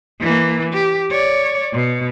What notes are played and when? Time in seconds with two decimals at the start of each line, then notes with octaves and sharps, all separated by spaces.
0.20 E3 A#3
0.74 G4
1.11 C#5 D5
1.73 B2